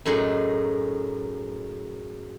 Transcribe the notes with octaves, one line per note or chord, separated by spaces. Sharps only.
F#2 A2 D#4 G#4 F#5